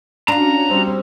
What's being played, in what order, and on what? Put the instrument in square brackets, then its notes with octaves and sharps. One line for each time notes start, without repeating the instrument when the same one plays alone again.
[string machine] C#4 F#4 [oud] D4 F4 [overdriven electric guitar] A#5
[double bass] G3 C4